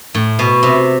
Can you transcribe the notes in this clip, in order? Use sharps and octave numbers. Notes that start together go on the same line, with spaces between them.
A2
B2
C3